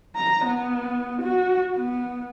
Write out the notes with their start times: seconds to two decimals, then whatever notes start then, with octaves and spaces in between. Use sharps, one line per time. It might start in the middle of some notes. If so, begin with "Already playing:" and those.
0.16 A#5
0.45 B3
1.22 F#4
1.76 B3